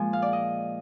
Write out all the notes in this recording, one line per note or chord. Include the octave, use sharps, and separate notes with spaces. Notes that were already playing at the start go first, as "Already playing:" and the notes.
Already playing: A#2 F3 G#3 G#5
F5
D5
D#5